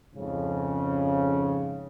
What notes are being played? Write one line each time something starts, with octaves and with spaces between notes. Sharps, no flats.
F2 G#2 C#3